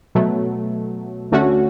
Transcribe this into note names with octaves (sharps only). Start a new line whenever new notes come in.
B2 F#3 A3
D2 D3 A3 C#4 F#4